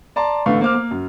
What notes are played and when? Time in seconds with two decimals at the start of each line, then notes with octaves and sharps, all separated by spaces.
0.16 D5 A5 A#5 C6
0.46 A1 D3 A3 B3 F5 C#6
0.61 A#3 C5 D6 F6
0.75 A#3
0.91 F#2